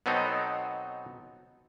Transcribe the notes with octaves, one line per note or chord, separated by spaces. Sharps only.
B2 F#3 B3 C4 D#4 A4